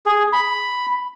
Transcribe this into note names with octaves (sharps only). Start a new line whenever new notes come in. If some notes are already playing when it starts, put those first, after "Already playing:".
G#4
B5